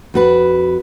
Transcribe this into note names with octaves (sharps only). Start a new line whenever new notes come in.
F2 F#4 B4